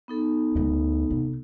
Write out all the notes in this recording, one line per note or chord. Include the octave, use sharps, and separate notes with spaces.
B3 D#4 A4
D2 C#3
C3